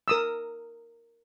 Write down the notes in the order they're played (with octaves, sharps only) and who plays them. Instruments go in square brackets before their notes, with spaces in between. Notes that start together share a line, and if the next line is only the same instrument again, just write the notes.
[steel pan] A#4 D#6 E6